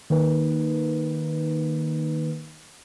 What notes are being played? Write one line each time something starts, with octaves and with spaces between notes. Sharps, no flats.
D#3 A#3 D#4 B4